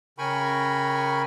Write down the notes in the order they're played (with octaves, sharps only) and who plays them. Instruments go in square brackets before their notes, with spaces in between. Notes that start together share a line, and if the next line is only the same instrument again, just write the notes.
[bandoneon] C#3 A#4 G5 G#5 B5 C#6